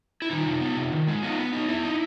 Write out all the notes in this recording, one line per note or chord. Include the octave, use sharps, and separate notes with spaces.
E4
D#3 D#4 F4
C3
B3
C3
D#3
G#3
B3 D#4 F4
B3
B3 D#4
B3 E4
D#4